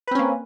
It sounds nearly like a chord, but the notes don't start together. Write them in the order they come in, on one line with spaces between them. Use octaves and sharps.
B4 C4 C#4 A#3